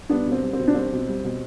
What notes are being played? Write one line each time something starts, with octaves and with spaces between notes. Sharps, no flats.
G3 B3 D4
B2
C4
G3
C4
B2
D4
G3 C4
B2
G3
B2